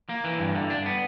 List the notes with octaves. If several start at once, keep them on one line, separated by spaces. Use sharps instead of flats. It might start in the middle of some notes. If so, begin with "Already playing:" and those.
A#3
E3
G2
D3
D4
B3